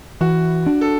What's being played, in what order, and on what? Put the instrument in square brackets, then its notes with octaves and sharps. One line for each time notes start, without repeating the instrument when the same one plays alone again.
[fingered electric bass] E3 [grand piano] F#4
[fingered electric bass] D4
[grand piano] A4